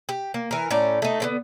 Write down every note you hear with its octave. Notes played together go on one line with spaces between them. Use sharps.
G4
A#3
E3 A#4
A2 C#4 D5 A#5
A3 D#4
D3 G#3 B3